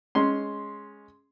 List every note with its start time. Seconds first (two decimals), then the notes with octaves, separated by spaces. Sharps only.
0.15 G#3 C#4 C6